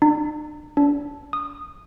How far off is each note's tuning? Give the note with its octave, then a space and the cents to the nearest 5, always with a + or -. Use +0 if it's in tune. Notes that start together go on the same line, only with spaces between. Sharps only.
D4 +40
D4 -30
D#6 -15